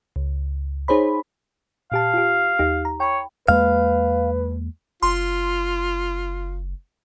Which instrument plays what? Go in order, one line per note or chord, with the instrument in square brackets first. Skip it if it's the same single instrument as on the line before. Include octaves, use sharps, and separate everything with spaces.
[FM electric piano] C#2
D#4 G#4 C5 C#5 B5
[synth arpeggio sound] A#2 G4 A5 [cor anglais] F5
[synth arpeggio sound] F4 G4
D#2 D#4 G4
A#5
[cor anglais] C#5 [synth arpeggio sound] G5 B5
[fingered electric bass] E2 G#3 A#3 [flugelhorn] B4 [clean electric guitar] F5
[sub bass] F#1 [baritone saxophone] F4 [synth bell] C6